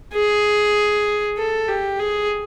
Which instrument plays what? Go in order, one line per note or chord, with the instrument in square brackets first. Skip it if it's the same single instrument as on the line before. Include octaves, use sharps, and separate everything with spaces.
[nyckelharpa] G#4
A4
G4
G#4